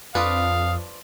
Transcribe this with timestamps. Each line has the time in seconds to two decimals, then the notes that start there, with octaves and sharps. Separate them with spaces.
0.15 F2 F3 D4 B4 F5 D#6